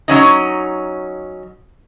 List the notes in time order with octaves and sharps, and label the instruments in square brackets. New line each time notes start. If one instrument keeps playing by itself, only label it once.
[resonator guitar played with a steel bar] F#3 C#4 D#4